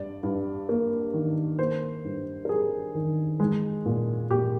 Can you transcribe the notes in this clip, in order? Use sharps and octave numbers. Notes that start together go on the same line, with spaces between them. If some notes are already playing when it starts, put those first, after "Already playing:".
Already playing: G2 D5
G2
A#3
D#3
A#3 C5
G2
A#4
G3 G#4
D#3
G#3
A#2
A#2 G4